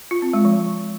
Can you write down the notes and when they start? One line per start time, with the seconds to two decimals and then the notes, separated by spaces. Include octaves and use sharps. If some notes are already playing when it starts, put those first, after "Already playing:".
0.11 F4
0.22 C4
0.33 G#3
0.45 F3